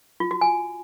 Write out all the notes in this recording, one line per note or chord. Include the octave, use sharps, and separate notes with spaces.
F4
F#4
G#5